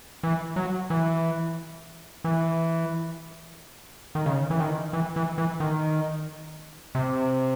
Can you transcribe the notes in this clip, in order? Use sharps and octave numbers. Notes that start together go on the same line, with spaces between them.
E3
F#3
E3
E3
D#3
C#3
E3
D#3
E3
E3
E3
D#3
C3